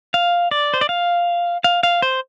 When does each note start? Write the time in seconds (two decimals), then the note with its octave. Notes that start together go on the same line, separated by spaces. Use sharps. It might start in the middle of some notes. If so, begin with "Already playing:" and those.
0.14 F5
0.51 D5
0.74 C5
0.81 D5
0.89 F5
1.64 F5
1.83 F5
2.02 C5